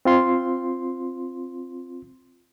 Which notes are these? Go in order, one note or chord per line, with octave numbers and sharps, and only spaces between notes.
C4 F4 C6